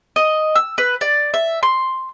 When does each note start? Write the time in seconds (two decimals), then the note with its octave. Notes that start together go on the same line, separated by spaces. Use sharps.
0.16 D#5
0.55 E6
0.78 B4
1.01 D5
1.34 E5
1.63 C6